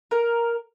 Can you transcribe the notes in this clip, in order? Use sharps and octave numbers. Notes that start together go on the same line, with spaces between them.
A#4